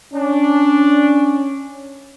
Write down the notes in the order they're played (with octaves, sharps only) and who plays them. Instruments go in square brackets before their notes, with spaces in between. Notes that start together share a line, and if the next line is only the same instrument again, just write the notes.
[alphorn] C#4 [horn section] D4